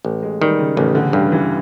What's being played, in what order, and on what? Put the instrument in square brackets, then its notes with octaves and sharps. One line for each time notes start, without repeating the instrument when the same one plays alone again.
[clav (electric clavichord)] A1
[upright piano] G#3
[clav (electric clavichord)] D#3 [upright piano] G3
[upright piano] C#3
[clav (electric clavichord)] A1 [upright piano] C#3
[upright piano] D3
[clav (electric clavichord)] G2 [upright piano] D3
[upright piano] E3